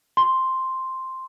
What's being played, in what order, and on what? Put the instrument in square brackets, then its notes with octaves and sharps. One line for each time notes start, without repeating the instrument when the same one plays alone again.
[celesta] C6